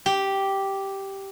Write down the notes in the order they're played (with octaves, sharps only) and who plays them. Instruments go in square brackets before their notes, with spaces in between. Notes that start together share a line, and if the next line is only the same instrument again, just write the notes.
[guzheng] G4